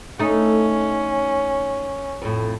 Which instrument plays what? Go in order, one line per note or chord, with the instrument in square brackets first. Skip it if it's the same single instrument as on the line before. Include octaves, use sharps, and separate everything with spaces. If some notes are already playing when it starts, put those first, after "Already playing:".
[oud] A3 D#4 [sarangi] C#4
[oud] F2 A2